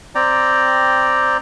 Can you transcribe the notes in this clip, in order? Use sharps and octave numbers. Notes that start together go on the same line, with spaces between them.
C4 D5 G5 A#5